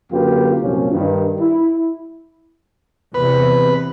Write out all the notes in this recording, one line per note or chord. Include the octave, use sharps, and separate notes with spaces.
F#2 D3 A#3 F4 G4 B4
C2 F#2 A#2 F3 C#4
G2 D#3
E4
E2 C3 B4